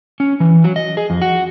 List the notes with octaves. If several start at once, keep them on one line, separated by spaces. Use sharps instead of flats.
C#4
E3
F#3
D#5
G#4
F2
F#4